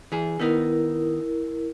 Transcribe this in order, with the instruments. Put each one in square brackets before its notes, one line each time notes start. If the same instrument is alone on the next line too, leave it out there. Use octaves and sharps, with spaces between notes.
[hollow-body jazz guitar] E3 G#4
[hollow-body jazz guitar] D#3 B3 D#4 [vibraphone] E4 A#4